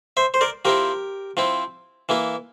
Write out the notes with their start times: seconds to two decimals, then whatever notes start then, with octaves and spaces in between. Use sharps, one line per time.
0.17 C5 E5
0.34 C5
0.41 A#4 D5
0.65 F3 C4 E4 G4 A#4
1.37 F3 C4 E4
2.09 E3 A#3 E4